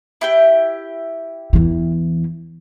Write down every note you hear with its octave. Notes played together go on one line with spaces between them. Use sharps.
E4 G4 G5
E2 E3